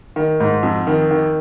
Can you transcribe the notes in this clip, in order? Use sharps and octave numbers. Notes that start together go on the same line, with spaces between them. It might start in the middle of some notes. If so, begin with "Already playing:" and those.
D#3
G#2
F2
D#3
D#3